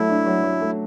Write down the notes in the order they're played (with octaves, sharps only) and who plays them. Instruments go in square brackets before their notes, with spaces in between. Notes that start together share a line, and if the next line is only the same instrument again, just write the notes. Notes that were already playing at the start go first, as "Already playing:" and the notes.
Already playing: [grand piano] F#3 A3 [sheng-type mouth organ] E4
[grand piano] D4
F#3
F#3
A3